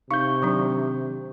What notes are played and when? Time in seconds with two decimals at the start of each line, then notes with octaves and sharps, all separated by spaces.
0.11 C3 D#4 F5 C#6 G6
0.42 D#3 F#3 D4